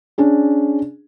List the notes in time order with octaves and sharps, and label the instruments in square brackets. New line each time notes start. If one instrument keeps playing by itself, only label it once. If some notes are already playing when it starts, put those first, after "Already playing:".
[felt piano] C#4 D4 G#4